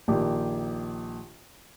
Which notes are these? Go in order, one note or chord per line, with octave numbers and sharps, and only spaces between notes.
A#1 D#3 G4